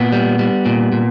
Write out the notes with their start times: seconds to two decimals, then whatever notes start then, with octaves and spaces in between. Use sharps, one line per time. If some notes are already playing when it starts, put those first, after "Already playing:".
Already playing: A#2 B3
0.12 G3
0.39 G3
0.66 A#2
0.92 A#2